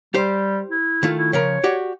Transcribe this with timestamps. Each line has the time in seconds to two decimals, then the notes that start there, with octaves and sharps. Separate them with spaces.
0.14 G3 G4 C5
0.70 E4
1.03 D#3 A3 F4
1.16 E4
1.33 C#3 F3 A#4 C#5
1.64 F#4 G4 D5